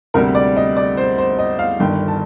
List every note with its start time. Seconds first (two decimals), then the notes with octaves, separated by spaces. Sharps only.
0.14 D2 C3 G3 A#4
0.35 D5
0.57 D#5
0.77 D5
0.97 C5
1.18 C5
1.39 D#5
1.59 F5
1.80 G1 G2 D#3 G5
2.08 A5